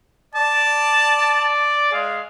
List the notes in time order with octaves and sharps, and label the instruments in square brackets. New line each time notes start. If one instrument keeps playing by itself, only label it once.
[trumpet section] D5 [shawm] A5
[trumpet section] G#3 G#4 F5